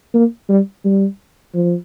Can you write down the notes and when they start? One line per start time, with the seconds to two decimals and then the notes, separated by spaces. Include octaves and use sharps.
0.14 A#3
0.49 G3
0.85 G3
1.54 F3